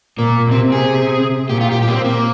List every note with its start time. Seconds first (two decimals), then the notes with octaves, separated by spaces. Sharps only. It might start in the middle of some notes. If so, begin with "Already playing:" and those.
0.18 A#2 A#3
0.51 C3 C4
0.72 G#4
1.49 A#2 G4
1.61 F4
1.72 G4
1.82 A#2 G4
1.88 A#3
1.93 C4
2.04 A#3